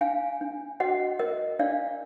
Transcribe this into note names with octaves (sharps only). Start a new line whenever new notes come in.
D4 F5 G#5
D4
F#4 D#5 F#5
A#4 D#5
D4 D5 F5